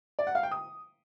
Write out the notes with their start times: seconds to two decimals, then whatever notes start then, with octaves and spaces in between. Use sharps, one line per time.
0.19 D5
0.27 F#5
0.35 F5
0.43 G5
0.51 D#6